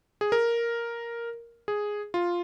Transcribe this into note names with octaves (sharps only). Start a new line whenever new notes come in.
G#4
A#4
G#4
F4